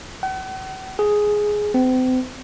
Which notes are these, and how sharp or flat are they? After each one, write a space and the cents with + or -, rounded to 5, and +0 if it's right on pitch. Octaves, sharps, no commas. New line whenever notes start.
F#5 +45
G#4 +5
C4 -40